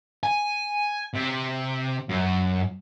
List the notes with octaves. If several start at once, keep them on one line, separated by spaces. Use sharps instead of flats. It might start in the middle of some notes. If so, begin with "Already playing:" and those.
G#5
C3
F#2